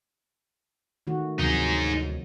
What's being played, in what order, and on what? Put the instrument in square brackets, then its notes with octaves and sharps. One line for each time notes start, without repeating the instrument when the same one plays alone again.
[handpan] D#3 A3 F#4
[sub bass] D2 [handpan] C3 F3 F#3 [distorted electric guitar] D#4 G#4